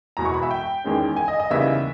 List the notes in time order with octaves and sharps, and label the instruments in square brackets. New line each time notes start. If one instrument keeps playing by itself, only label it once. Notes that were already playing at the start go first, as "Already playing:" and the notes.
[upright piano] E1 E2 B2 A#5
C#6
B5
E5
G5
E2 D#3 G#3 C#4
G#5
D#5
D#5
D#2 C#3 E3 G3 B3 E5